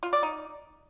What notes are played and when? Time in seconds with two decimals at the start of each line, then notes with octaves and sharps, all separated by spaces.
0.03 F4
0.13 D5
0.23 D#4